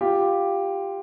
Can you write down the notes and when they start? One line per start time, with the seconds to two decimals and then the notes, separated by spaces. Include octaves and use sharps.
0.01 F4 G4